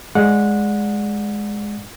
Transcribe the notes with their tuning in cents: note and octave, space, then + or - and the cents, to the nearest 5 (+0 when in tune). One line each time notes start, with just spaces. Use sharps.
G#3 +0 D5 +0 F#5 -20